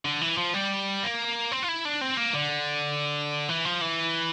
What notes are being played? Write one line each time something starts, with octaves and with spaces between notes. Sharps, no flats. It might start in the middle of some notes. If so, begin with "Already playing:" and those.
D3
E3
F3
G3
A#3
C4
F4
E4
D4
C4
A#3
D3
E3
F3
E3